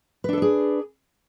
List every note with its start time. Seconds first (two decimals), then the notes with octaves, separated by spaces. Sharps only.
0.24 B4
0.29 D4
0.33 A4
0.38 D5
0.42 G#4